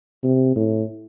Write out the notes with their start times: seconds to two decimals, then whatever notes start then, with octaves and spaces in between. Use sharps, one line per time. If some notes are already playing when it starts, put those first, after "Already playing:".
0.24 C3
0.56 A2